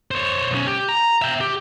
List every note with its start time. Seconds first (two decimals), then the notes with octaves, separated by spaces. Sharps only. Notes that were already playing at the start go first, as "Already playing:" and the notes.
0.11 C5 C#5
0.51 B1 C#4
0.67 G4
0.89 A#5
1.22 E5 G5
1.41 G4